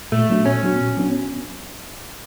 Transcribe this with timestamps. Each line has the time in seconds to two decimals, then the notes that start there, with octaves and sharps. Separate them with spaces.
0.12 A#2 A3
0.30 F#3 B3 D4 F#4
0.46 A#2 C#4
0.63 F#3 B3 D4 F#4
0.81 A#2
0.97 F#3 B3 D4 F#4